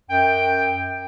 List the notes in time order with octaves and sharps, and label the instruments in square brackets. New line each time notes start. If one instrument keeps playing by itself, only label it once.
[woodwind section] F#2 G5